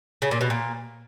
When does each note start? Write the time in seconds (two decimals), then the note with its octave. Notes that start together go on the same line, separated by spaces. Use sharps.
0.22 C#3
0.31 A#2
0.41 B2
0.50 A#2